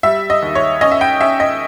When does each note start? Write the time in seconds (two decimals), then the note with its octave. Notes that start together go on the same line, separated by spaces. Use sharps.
0.03 G3 E5
0.30 D#5
0.42 D#2
0.55 C#5
0.81 C#4 D#5
0.92 E5
1.01 G5
1.21 C#4 E5
1.40 D#5